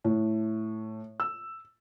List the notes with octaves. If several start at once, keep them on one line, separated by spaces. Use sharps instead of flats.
A2
E6